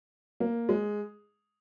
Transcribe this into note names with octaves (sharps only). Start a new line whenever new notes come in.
A#3
G#3